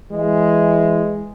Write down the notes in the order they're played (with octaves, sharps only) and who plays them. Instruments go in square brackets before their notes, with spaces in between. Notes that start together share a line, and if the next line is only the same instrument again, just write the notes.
[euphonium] E3 [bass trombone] G#3